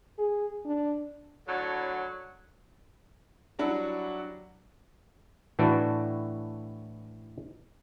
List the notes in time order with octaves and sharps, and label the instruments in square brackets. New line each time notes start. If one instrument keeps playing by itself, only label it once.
[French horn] G#4
D4
[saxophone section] A2 D3 F#3
[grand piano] F#3 G3 D4 E4 F#4
[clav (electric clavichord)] A2 E3 D4 F#4 A4 D5